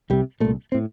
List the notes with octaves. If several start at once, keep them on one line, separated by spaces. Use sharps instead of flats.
C2 C3 G3
C2 A#2 A3
A2 C4